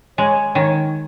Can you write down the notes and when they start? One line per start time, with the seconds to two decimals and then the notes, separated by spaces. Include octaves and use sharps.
0.18 G#3 C#5
0.55 D#3 C#5